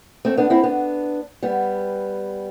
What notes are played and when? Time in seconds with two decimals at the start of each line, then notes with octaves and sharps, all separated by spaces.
0.25 A3 C4
0.37 B3 D4
0.50 C4 E4
0.63 B3 D4
1.42 G3 B3